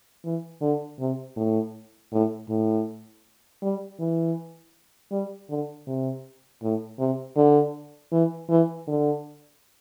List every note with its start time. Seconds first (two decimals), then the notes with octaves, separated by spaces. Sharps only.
0.25 E3
0.61 D3
0.99 C3
1.36 A2
2.12 A2
2.49 A2
3.62 G3
3.99 E3
5.11 G3
5.49 D3
5.87 C3
6.63 A2
6.99 C3
7.36 D3
8.12 E3
8.49 E3
8.87 D3